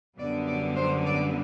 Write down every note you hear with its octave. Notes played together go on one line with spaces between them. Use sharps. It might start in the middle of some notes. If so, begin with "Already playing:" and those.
F#2 D3 G3 B3 D5
D5
C5
D5